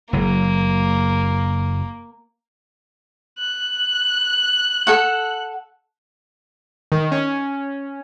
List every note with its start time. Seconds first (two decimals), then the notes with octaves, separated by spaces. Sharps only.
0.13 F#1 F#3 A#3
3.38 F#6
4.87 A4 F#5
6.92 D#3
7.12 C#4